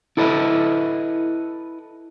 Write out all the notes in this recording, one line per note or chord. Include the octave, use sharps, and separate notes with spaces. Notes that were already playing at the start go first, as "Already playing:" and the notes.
E4 A4 B4 D#5 E5